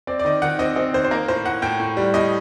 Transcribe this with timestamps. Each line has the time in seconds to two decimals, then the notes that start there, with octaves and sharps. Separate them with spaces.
0.07 C4 D5
0.19 D5
0.25 D#3 D#5
0.42 D#3 F#5
0.59 C4 D#5
0.76 C4 D#5
0.94 D#3 C5
1.04 C5
1.11 A#3 A#4
1.28 A2 C5
1.46 A2 F#5
1.62 A2 G5
1.80 A2
1.97 G3
2.14 A2 D#5